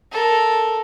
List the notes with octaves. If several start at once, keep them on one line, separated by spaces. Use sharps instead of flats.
A4 A#4